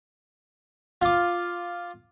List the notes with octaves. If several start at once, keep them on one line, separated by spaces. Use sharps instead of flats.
F4 D6